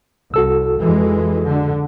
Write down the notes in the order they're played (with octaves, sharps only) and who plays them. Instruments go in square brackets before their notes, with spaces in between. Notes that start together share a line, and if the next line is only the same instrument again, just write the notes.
[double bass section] C2 [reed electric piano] F#4 A4 E6
[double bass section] F2 E3 G#3
D3